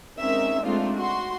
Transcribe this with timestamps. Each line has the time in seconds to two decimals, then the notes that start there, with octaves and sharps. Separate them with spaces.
0.19 G#3 C4 C#4 D#4 A#4 E5
0.63 G#3 A3 C4 D4 D#4 F4
0.97 F#4 C6